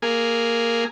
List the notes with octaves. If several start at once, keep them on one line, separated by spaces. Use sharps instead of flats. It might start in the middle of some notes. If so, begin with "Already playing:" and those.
A#3 G#4